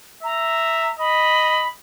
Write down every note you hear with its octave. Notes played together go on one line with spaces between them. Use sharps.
E5 A#5
D#5 B5